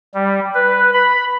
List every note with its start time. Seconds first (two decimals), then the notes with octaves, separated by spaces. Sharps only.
0.14 G3
0.55 B4
0.94 B5